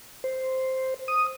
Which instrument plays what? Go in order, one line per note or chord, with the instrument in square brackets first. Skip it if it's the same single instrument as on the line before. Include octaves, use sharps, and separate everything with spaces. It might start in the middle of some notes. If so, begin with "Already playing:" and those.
[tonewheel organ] C5
D#6